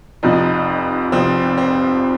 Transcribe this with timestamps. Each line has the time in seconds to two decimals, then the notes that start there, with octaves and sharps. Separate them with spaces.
0.23 F1 F2 F3 D#4
1.12 F1 F2 F3 C4
1.58 C4